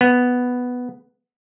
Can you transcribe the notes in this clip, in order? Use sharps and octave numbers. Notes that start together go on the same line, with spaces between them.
B3